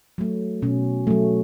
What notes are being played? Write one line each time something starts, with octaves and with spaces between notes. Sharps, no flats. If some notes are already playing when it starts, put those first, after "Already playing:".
F#3 A3
B2 C#4
F#3 A3